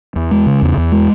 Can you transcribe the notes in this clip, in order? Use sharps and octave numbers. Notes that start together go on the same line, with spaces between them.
E2
G#3
C#3
E2
E2
G#3